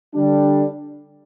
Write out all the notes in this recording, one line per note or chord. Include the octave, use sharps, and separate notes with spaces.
D3 G3 D4